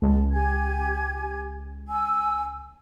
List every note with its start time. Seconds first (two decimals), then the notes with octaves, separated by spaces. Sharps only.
0.02 C#2 A5
0.32 G4 G#5 G#6
1.89 G#5 E6